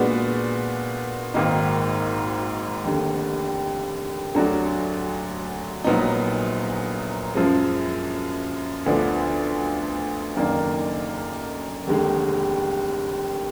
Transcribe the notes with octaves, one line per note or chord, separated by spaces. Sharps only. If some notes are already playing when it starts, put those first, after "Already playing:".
Already playing: A#2 G#3 B3 D4 F#4
G#1 G#2 D#3 A#3 D#4
F1 D#2 D3
D2 D3 F#3 D4 F#4
A#1 A#2 F#3 B3 D#4
F#2 F3 G#3
D2 D3 F3 B3 D4
F#1 F#2 D#3 A#3 D4
F1 D#2 D3 G#3